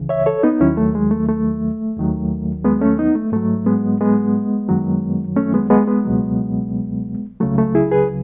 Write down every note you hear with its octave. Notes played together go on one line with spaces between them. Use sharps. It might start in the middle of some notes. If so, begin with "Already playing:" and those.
Already playing: C#2 C#3 E3
C#5 E5
A4 C#5
B3 D#4
D#2 D#3 F#3 C#4 E4
A3
G#3
A3
A3
D#2 D#3 F#3
G#3 B3
A3 C#4
B3 D#4
A3
G#2 F#3 A3
G#3 B3
G#3 B3
F#2 D#3 F#3
A3 C#4
G#3 B3
G#3 B3
G#3 B3
C#2 B2 F#3
C#2 C#3 F#3 A3
A3
E4 G#4
G#4 B4